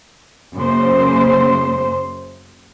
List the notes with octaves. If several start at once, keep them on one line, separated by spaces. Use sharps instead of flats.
F#2 C#3 A#3 C5